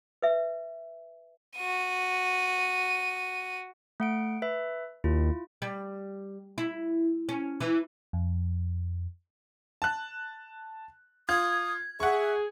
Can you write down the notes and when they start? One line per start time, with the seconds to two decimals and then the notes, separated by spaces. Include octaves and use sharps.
0.22 B4 E5
1.56 F#4 D#7
4.00 A3 F#5 D7
4.42 B4 E5
5.04 D#2 E4 F4
5.62 G3
6.58 E4
7.29 C#4
7.60 E3
8.13 F2
9.82 A5 F#6
11.29 F4 D#6 G#6
12.00 G#4 E5 F#5 C#6